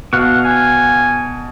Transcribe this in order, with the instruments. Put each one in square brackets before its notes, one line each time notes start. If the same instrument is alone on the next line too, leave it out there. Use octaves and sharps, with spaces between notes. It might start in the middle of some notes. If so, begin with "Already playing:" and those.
[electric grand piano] B2 [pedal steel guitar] F5 F#5 C#6
[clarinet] G#5